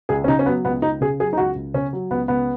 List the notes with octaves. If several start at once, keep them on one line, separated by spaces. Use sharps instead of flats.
C#2 G#4
C#4
C#3 D#4
C#4
F#3 B3
C#2 B3
C#2 D#4
C#3 G#4
F#3 G#4
D#4
C#2 F#4
C#2
C#3 C#4
F#3
C#2 B3
C#2 B3